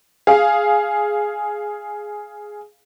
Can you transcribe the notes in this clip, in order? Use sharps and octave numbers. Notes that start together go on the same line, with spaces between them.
G#4 F5